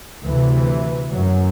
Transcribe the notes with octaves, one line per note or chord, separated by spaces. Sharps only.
D2 C3 E3
F#2 F#3